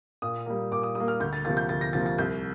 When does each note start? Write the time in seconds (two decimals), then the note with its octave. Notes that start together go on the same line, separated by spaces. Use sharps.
0.22 A#2 D#6
0.46 G3 A#3
0.72 A#2 D6
0.83 D#6
0.95 G3 A#3 D#6
1.08 F6
1.20 D2 G6
1.33 A6
1.45 C3 F3 A#3 A6
1.57 G6
1.69 D2 A6
1.81 A#6
1.93 C3 F3 A#3 A6
2.06 A6
2.18 C2 G6